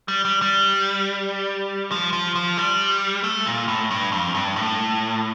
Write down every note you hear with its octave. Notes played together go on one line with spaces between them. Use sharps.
G3
G3
G3
F3
F3
F3
G3
A3
A#2
A2
G2
F2
G2
A2